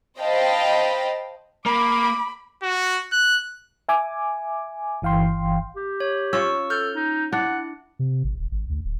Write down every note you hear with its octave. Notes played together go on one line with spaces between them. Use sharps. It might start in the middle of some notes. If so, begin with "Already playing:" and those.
C5 D#5 F5 G5 A5 B5
A#3 B5 D6
F#4
F#6
E5 G#5 D6
G1 E3 F5 G5 C6
G4
C#5
C#4 F4 C#6 E6
A4 F6 G6
D#4
D4 E4 F#5
C3
G#1
E1
G#1
D2
D1